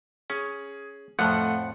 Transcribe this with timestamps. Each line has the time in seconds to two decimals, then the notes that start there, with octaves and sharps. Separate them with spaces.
0.30 C#4 G#4
1.19 F2 A2 F3 A3 F#5 C6